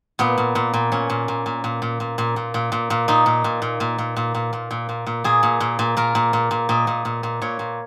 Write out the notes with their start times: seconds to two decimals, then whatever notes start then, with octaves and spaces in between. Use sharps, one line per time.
0.19 A#2 B3
0.38 A#2
0.55 A#2
0.73 A#2
0.92 A#2 C#4
1.10 A#2
1.28 A#2
1.46 A#2
1.64 A#2
1.82 A#2
2.00 A#2
2.18 A#2
2.36 A#2
2.54 A#2
2.72 A#2
2.90 A#2
3.08 A#2 D#4
3.26 A#2
3.44 A#2
3.62 A#2
3.80 A#2
3.98 A#2
4.16 A#2
4.34 A#2
4.53 A#2
4.71 A#2
4.89 A#2
5.07 A#2
5.24 A#2 G#4
5.43 A#2
5.60 A#2
5.79 A#2
5.97 A#2 A#4
6.15 A#2
6.33 A#2
6.51 A#2
6.69 A#2 D#5
6.87 A#2
7.05 A#2
7.23 A#2
7.42 A#2 C#5
7.59 A#2